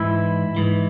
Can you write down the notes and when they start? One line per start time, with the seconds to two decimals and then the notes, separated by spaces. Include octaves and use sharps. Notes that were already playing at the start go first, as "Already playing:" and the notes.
Already playing: G#2 E3 E4
0.56 G#2 E3